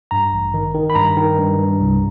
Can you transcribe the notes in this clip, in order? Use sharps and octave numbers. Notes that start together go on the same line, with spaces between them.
G2 A#5
A1
D#3
D#3
B5
G2 A#5
D#3
G2
G2
C2